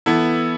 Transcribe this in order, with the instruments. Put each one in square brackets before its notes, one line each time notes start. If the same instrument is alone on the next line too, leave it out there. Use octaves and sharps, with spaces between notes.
[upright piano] E3 B3 E4 A4